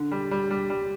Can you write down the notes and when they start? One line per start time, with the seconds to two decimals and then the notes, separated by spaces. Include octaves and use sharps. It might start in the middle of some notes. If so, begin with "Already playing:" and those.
Already playing: D3
0.11 G3
0.31 G3
0.51 G3
0.70 G3